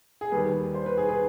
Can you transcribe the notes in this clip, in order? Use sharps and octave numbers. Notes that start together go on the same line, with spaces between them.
G#4
D#2 D#3 G3 B4
C5
B4
G#4
B4